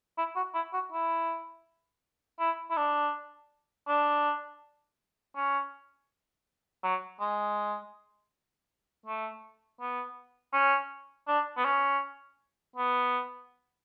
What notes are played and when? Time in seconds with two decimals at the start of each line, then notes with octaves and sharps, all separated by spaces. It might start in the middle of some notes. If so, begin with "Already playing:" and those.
0.18 E4
0.36 F#4
0.55 E4
0.73 F#4
0.92 E4
2.39 E4
2.71 E4
2.77 D4
3.88 D4
5.36 C#4
6.84 F#3
7.21 G#3
9.06 A3
9.80 B3
10.53 C#4
11.28 D4
11.57 B3
11.65 C#4
12.76 B3